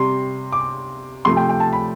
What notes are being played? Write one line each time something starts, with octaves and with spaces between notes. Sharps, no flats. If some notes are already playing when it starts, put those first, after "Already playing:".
Already playing: C3 G3 C6
D6
C3 F3 A3 C6
G5
G5
A5
B5